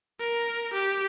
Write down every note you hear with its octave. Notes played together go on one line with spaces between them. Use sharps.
A#4
G4